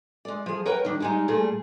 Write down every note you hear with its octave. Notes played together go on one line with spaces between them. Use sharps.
G#3 D5
F3 G#4
A#4 B4 C#5 F#5 G5
D#3 D4
G3 G#3 D#4
A#2 G3 A3 G#4